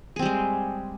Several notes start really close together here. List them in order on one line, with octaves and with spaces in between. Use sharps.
G#4 C4 G3 G#3